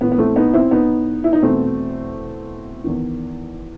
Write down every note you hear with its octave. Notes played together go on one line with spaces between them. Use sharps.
A2 E3 B3
B3
A3 C4
B3 D#4
C4 E4
B3 D#4
E4
D#4
E2 B2 A3 C4
E2 D#3